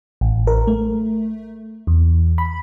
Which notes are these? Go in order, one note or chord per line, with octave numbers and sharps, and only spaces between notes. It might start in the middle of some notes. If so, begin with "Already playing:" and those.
A1
A#4
A3
E2
B5